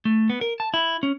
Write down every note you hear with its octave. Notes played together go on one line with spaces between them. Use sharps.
A3
B3
A#4
A5
E4
C#4